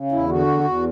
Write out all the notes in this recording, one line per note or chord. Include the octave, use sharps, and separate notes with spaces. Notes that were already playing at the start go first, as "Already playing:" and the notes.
Already playing: C#3
E2 E4
D3 F#4
E2
E2